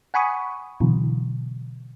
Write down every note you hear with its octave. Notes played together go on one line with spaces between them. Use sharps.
F#5 G#5 B5 C#6 D#6
B2 D3 E3 F#3